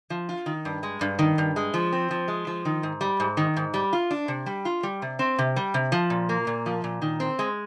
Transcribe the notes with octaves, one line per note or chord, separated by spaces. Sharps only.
F3
F4
D#3
G2
G#3
G2
D#3
G2
G#3
F3
C4
F3
G#3
F3
D#3
G#2
G3
G#2
D#3
G#2
G3
F4
D4
C3
G3
F4
G3
C3
C4
C3
G3
C3
F3
A#2
A#3
A#2
F3
A#2
D#3
C4
G#3